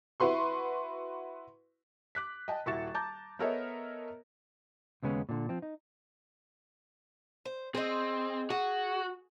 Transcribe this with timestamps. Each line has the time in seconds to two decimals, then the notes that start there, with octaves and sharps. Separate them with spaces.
0.20 E4 F#4 B4 C6 C#6
2.15 D6 F#6 B6
2.48 D#5 G5 A5
2.66 D#1 E4 F#4 C#6 A6 E7
2.94 A5 A#5 D6 G6 A6
3.39 B3 A4 A#4 C#5 D#5 E5
5.03 D#2 C#3 G#3 B3 C#4
5.29 A#2 D3
5.49 F3 C4
5.62 D#4
7.45 C5
7.75 C4 G#4 D#5
8.50 F#4 G#4